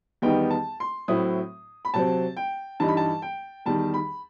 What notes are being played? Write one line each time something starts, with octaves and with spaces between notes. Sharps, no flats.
E2 D#3 G3 B3 D#4 G5
A5
C6
A2 F#3 C4 E4 D#6
B5
C3 F#3 C4 A5
G5
G2 E3 G3 D#4 A5
B5
A5
G5
E2 D#3 G3 A5
B5